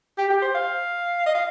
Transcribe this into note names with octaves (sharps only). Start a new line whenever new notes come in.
G4
G4
C5
F5
D#5
F5